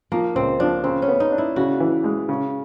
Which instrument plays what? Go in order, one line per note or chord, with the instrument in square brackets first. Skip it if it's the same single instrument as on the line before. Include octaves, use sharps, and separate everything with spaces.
[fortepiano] F3 [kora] A#3
[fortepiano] C#2 [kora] C4
[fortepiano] F3 [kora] D4
[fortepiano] C#3 [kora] C4
[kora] C#4
[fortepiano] B3
[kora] D#4
[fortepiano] D4
[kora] E4
[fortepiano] C#3 [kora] F#4
[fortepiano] E3
G#3
C#3